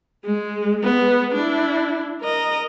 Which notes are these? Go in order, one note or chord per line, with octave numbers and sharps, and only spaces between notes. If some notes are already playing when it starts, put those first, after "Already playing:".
G#3
G#3 B3
D4 E4
A#4 D#5